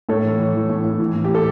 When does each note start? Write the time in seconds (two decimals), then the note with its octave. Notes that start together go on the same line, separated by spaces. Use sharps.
0.09 A2 A4 C#5
0.24 E3
0.39 E3
0.55 E3
0.69 A2
0.84 A2
1.00 E3
1.15 A2
1.24 G4
1.30 E3 A4